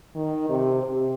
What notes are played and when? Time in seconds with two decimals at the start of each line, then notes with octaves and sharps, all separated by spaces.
0.15 D#3
0.49 C3
0.82 C3